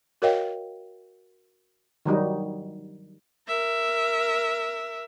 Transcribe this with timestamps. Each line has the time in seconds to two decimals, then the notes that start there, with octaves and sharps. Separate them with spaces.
0.22 F#4 A#4 C#5 D#5 F5 G5
2.05 D#3 F#3 G3 D#4
3.48 A#4 E5